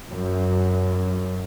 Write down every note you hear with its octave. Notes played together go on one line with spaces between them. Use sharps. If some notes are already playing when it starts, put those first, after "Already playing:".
F#2